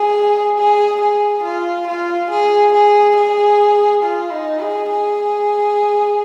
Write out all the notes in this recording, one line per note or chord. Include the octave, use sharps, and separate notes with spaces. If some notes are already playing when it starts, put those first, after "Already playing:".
Already playing: G#4
G#4
G#4
F4
F4
G#4
G#4
G#4
F4
D#4
G#4
G#4